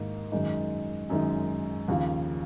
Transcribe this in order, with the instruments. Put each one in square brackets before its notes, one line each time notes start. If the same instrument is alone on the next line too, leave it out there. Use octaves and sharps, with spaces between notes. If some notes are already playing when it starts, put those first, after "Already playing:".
Already playing: [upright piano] G#2 D#3 A#3 D#4 F#4
F#2 D#3 G#3 D#4
F#2 D#3 G#3 D#4
D#2 C#3 F3